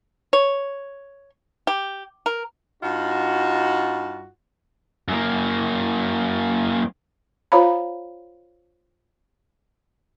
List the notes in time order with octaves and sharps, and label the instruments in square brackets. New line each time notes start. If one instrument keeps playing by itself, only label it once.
[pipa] C#5
G4
A#4
[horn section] G2 D#4 F4 F#4
[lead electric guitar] F#2 A#3
[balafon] F4 C5 C#5 F5 A#5 B5